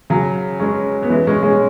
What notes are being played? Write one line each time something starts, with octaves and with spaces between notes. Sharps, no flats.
C#3 F#3
G#3 C#4
B3
E3 G#3
G#3 C#4
G#3 C#4